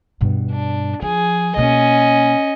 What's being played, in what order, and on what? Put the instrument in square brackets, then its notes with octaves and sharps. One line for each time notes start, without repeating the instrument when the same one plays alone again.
[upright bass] G2 B2
[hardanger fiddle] D4
[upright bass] F3 [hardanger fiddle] G#4
[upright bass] B2 A#3 [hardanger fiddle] C#4 D#5